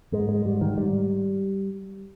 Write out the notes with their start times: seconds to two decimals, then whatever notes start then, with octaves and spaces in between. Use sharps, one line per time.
0.12 G#2 G#3
0.29 G#3
0.45 G#2 G3
0.61 D#3
0.77 G#2 G3